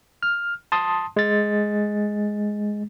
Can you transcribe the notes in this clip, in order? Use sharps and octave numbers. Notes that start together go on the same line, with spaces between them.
F6
A5 C6 D#6
G#3 A6